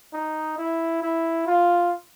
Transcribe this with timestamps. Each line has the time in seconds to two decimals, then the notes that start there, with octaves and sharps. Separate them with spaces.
0.13 D#4
0.58 E4
1.02 E4
1.47 F4